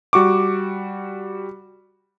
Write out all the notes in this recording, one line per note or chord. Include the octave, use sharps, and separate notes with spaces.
G3 F#4 C#6 D6